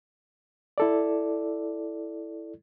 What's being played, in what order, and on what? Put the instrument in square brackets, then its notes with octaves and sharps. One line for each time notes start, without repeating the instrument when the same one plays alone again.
[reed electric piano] E4 A4 D5